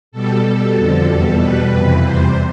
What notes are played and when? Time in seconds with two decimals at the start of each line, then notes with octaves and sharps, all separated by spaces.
0.12 B2 G3 A4
0.45 B2 G3
0.76 F2 D3 F3
1.07 E2 B2 G3
1.39 B2 G3 B4
1.72 F2 C3 E3
2.02 E2 C3 G3 C5